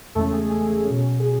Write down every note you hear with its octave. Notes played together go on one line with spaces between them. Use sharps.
E2 C#3 G#3 A3 C#4 A4
G#4
G#4
G#4
B2 F#3 C#4
G#4